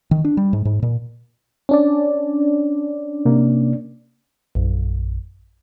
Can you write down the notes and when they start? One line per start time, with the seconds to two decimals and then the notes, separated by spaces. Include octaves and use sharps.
0.11 D#3
0.25 D4
0.37 G3
0.53 G#2
0.65 G#2
0.82 A#2
1.69 C#4 D4 D5
3.25 C3 A#3
4.55 A#1 F#2